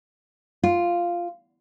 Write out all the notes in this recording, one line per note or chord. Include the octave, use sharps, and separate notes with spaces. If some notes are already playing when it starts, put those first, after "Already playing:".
F4